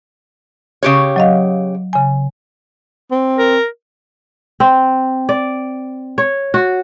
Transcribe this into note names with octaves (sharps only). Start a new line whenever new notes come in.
C#3 G4 C#5
F#3 D#5 F5
C#3 G#5
C4
A#4
C4
D5
C#5
F#4